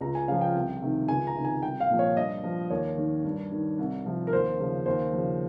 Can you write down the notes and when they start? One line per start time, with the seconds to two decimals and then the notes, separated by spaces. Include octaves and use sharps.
0.01 C#2 A#5
0.15 G#5
0.28 C#3 F3 F5
0.41 G5
0.55 C2
0.82 C3 D#3
1.08 C#2 G#5
1.27 A#5
1.35 C3 D#3
1.45 G#5
1.62 C2 G5
1.80 F5
1.90 A#2 F3
1.99 C#5
2.16 G2 D#5
2.44 F3
2.70 D#2 C#5
2.98 D#3
3.24 G2
3.52 D#3
3.79 C2
4.06 C3 F3
4.27 A#4
4.32 D#2 C5
4.60 C#3 F3
4.86 D#2 C5
5.13 C#3 F3